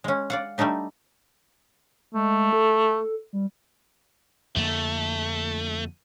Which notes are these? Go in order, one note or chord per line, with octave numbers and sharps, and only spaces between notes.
G#3 C#4
D5 F5 F#5
G3 A3 D4 D#4 G4
G#3 A3
A4
G3
F2 D3 A3 A#3